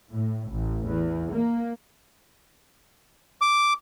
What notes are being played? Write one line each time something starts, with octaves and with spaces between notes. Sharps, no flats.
A2
A1
E2
A#3
D6